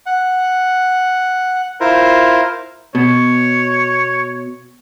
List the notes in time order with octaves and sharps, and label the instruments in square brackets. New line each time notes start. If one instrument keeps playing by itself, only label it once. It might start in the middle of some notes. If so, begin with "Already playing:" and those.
[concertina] F#5
E4 F4 A#4 C5
[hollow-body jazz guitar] B2 [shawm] C#5